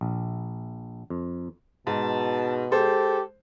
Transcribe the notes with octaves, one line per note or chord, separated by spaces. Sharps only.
A#1
F2
G#2 B2 A5
G#3 G4 A4 C5